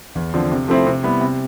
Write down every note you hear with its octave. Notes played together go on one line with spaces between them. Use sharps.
E2
D3 F3 C4
C3
F3 A3 C4 E4
C3
G3 B3 E4
C3